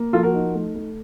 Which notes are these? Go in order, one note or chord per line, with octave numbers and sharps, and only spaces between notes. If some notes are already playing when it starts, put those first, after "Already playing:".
Already playing: A#3
F3 F4 A4
F#4 A#4
D#4
A3
A3